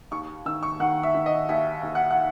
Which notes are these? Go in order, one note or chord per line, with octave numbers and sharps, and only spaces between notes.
D#2 C#6
D#3 E6
C#6
D#3 F#5
E5
D#3
D#5
D#2 E5
D#2
F#5
F#5